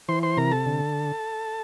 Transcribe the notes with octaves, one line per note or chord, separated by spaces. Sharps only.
E3 C5 C6
C5 C6
C3 A#4 A#5
A4 A5
D3